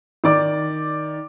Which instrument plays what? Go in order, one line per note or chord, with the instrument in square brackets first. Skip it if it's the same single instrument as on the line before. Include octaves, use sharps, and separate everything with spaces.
[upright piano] D#3 D5 D6